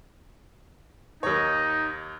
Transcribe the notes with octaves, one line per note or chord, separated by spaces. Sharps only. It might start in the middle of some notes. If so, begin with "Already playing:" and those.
D#2 D#4 C#5